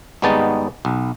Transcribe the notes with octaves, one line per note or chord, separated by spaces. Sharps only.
G#1 G3 G#3 B3 D#4 A5
B1